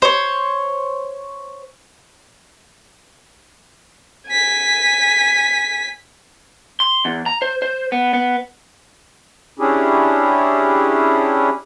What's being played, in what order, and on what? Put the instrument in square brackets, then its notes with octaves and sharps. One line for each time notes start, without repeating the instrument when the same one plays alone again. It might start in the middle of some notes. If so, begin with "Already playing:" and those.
[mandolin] C5 C#5
[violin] G#5 B6
[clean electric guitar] C6
E2
A#5
C5
C5
B3
B3
[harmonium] C#4 D4 E4 G4 G#4